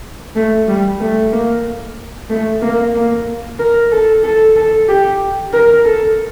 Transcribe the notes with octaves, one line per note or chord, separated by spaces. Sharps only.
A3
G3
A3
A#3
A3
A#3
A#3
A#4
A4
A4
A4
G4
A#4
A4